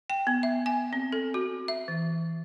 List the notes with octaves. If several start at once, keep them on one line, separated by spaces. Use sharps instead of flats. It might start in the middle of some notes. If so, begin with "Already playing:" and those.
G5
B3
E5
G#5
C4
A4
F#4
E5
E3